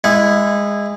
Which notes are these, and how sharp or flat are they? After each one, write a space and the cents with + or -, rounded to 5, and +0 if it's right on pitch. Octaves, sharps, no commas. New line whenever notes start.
G#3 -20 E4 +0 F#5 -30